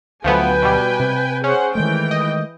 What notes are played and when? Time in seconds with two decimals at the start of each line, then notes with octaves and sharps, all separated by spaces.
0.24 D2 F3 F#3 A3 B3 B4 G5 G#5
0.62 B2 G3
1.00 C3
1.44 C#4 G#4 C5 F#5
1.75 D#3 E3 G#3 A3 G5
2.11 D#5